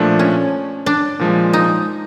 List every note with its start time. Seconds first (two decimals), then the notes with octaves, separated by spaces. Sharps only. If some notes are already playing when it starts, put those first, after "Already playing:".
Already playing: A#2 F3 A3 D4
0.19 C#4
0.86 D4
1.19 A#2 F3 G#3
1.53 D#4